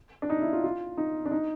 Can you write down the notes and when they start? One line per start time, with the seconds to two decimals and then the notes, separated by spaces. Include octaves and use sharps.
0.22 D4
0.30 D#4
0.41 E4
0.53 F4
0.64 F4
0.98 D#4
1.25 D4
1.31 D#4